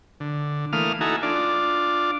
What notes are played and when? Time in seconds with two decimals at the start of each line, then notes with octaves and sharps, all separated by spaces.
0.20 D3
0.73 E3 A3 A#3 F5 D#6 F6
1.01 D#4 E4 F#4 A4 G#5 A#5
1.23 D4 F4 D5